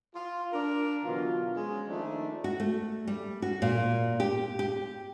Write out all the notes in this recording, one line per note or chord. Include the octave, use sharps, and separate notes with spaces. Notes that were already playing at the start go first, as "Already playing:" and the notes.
F4
D4 A#4
B2 D3 E3 F#3 F4
F3 G#3 C#4
D#3 F3 A3 A#3 D4 D#4
F#4
A3
G3
F#4
A#2
G4
G4